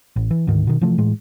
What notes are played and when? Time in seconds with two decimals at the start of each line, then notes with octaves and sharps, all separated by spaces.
0.16 A1
0.31 E3
0.47 D2 G#2 D#3
0.67 B2 D#3
0.81 C3 E3 F3 A3
0.98 A2 E3 G#3